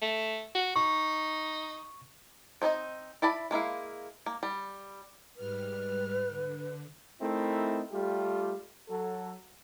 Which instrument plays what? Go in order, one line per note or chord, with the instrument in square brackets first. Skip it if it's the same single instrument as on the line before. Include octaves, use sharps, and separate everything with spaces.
[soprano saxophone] A3
F#4
[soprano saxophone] D#4 [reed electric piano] C#6
[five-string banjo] C4 D#4 E4 D#5
E4 D5 A5 B5
G#3 A#3 E4 F5
A#3
G3
[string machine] G#2 G3 F6 [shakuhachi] B4
[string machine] D3
[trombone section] A3 C4 D#4 E4 A#4
G3 A3 F4 G4
F#3 A4